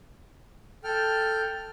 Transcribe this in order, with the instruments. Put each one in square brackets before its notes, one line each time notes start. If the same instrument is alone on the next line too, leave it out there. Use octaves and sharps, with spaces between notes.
[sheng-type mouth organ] A4 G5 F6